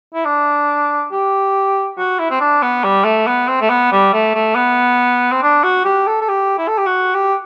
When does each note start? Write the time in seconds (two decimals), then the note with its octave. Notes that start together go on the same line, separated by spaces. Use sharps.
0.14 E4
0.25 D4
1.12 G4
1.97 F#4
2.19 E4
2.31 C4
2.40 D4
2.62 B3
2.84 G3
3.05 A3
3.27 B3
3.48 C4
3.61 A3
3.70 B3
3.92 G3
4.13 A3
4.35 A3
4.56 B3
5.31 C4
5.43 D4
5.64 F#4
5.85 G4
6.07 A4
6.21 A4
6.29 G4
6.58 E4
6.68 A4
6.78 G4
6.86 F#4
7.15 G4